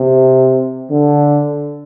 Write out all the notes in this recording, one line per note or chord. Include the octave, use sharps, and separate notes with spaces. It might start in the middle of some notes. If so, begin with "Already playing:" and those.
Already playing: C3
D3